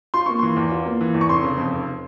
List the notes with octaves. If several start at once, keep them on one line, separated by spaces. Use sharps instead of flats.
F4 C6
A#3 C#6
E3 C6
E2
F4
A#3
E3
E2
C#6
F1 C6
C#3
F2
F1